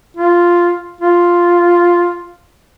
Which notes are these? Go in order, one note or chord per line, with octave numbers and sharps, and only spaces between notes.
F4
F4